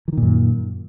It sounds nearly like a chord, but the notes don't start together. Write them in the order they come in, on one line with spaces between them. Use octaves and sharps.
E3 D#3 A#2 F#2